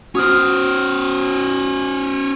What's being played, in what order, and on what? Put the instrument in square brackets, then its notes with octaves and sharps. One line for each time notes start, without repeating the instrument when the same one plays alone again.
[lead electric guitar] C#4 C5 [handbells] F#4 D#6 F6